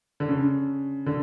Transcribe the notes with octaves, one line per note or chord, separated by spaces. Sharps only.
D3
C#3
D3